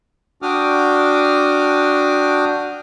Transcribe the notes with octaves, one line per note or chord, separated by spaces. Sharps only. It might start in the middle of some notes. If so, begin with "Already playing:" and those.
D4 F#4 G5 D6 D#6 F6